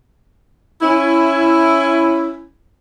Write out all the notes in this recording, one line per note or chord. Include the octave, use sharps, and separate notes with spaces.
C#4 E4